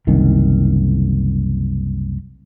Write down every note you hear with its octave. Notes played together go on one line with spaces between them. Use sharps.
F#1 C2 D#3